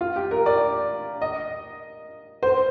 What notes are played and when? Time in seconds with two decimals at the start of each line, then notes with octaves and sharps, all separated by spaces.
0.01 F4
0.16 G4
0.31 A#4
0.46 D5
1.22 D#5
2.43 C5